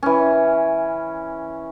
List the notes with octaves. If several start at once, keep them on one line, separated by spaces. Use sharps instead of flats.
E3 C#4